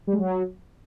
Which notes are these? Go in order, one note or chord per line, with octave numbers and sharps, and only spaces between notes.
G3
G#3
F#3